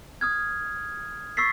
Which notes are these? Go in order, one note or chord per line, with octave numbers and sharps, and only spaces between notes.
D#6 F6 G#6
C#6 E6 A6 B6 C7